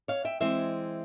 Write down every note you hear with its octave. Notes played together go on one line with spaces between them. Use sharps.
C#5 F5
E5 G5
E3 G#3 C4 C5 E5